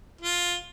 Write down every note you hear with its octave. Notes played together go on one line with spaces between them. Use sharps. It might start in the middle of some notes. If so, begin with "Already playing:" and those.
F4